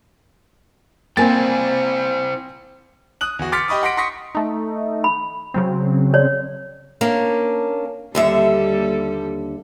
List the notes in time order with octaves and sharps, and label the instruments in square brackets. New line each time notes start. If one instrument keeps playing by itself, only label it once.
[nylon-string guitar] A#3 [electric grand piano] C4 G#5 A6 [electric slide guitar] E4 C5 G5
[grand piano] D#6 F#6 F#7
E2 F#4
C6 D6 F6 A6 B6 C#7
G4 D#5 B5 C#6 D#6
F#5 B5 C6 A#6 B6 D7
C6 C#6 D#6 A#6 B6 C#7
[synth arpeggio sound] A3 D#4
[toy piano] B5
[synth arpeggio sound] C#3 F#3 C4
[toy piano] C#5 D5
[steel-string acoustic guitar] A#3 C#4 D4
[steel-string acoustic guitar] D#2 D3 E5 [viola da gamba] G3 A#3 A4